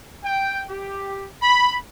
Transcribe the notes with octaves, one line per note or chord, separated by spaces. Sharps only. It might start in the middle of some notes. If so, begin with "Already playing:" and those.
G5
G4
B5